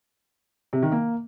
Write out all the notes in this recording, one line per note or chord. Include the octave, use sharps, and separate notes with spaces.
C3
D#3
A#3